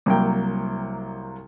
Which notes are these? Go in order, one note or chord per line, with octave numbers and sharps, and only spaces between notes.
C2 F#3 A#3 G5